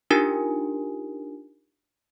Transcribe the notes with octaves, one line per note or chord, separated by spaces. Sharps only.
D4 D#4 F4 G4 A#4 G#5